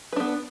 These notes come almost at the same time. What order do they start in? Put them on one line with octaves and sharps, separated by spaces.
B4 D4 B3